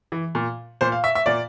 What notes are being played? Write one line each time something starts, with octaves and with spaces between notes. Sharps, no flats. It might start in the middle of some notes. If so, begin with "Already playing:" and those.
E3
A#2
A#2 C5
F5
E5
E5
A#2 D5